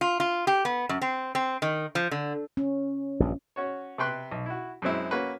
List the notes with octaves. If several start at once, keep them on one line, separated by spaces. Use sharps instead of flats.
F4
F4
G4
B3
F#2
C4
C4
D#3
F3
D3
C#4
A#1 G2
C#4 F#4 C#5
C3 B4 G5 C6 F#6
B1
E4 F#4
F#2 F#3 G#3 C4 E4
A#3 C#4 F#4 B4